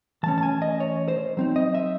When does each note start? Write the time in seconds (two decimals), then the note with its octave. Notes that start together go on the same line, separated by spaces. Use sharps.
0.23 E3 A3 C#4 A5
0.38 A5
0.43 G#5
0.62 D#5
0.80 C#5
1.08 C5
1.37 F#3 C4 D#4
1.56 D#5
1.75 E5